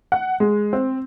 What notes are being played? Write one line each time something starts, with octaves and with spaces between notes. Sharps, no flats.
F#5
G#3
C4